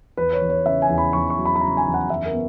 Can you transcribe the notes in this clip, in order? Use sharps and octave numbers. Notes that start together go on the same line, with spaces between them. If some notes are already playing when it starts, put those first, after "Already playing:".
E2 B4
C#5
E2
C#5
C#3 E5
G#5
E2
B5
E2 C#6
C#6
F#3
B5
B5
C#3 A#5
G#5
E2
F#5
F#2 E5
A#4
B3